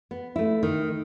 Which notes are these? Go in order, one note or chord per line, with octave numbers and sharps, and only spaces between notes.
B3
A3 E4
D#3